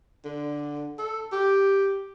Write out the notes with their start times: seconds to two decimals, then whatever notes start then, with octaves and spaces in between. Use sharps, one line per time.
0.25 D3
0.99 A4
1.32 G4